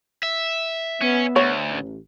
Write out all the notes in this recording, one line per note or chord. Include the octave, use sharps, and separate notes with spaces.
E5
B3 C#4
D2 C#5
A1